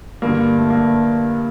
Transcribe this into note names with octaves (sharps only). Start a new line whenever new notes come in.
G2 D3 A#3
A3
A#3